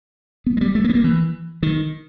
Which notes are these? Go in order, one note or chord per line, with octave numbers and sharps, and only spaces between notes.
B3
G#3
G3
A3
A#3
B3
A#3
E3
D#3